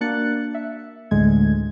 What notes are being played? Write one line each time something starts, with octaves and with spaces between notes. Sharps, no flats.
A#3 D4 F#4 F#6 A6 C#7
E5
A1 D2 A2 D3 G#3 G#6